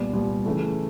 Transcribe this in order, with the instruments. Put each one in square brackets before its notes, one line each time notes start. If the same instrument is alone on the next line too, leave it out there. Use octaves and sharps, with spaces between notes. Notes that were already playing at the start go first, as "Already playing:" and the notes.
Already playing: [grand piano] C2 A#2 G3 B3 D5
C2 A#2 G3 B3
C#3 E3 A3